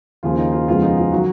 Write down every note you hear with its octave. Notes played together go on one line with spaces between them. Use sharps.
D#2 C#3 F3 A#3 F4
D#4
F4
F2 C#3 F3 G#3 B3 F4
D#4
F4
D#3 F#3 F#4